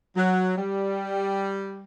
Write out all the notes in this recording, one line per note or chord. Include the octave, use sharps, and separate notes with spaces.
F#3
G3